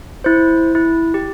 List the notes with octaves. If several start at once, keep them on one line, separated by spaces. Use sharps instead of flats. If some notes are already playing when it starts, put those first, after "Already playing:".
E4 C5
E4
G4